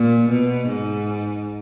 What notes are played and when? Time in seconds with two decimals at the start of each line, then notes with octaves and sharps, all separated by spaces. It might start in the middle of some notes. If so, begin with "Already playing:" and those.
Already playing: A#2
0.30 B2
0.68 G#2